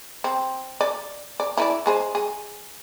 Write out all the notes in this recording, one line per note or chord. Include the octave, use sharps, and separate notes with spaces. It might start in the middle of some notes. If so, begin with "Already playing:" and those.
C4
D5
D5
E4 B4 D5
G#3 G#4 C5
G#4